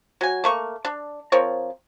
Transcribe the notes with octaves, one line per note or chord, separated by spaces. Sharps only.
F#3 G#5
A3 A#3 C#6
D4
F3 C4 A#4 C#5